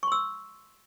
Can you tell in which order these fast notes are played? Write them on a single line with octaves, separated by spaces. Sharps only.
C#6 C6 E6